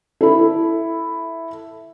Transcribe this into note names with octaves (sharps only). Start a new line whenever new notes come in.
E4 A4